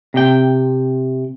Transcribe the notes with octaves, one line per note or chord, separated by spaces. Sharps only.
C3 G5